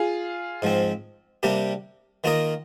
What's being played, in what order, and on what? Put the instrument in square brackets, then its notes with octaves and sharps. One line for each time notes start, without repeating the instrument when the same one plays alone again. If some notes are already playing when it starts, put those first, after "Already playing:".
Already playing: [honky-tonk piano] F4 G#4
[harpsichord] G#2 F3 C4
C3 G3 A#3 D4 G4
D#3 A#3 F4 A#4 D#5